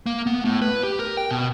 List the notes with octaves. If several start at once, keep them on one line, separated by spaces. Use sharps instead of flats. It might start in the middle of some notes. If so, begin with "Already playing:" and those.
A#3
B3
A2
B4
G4
A#4
G5
B2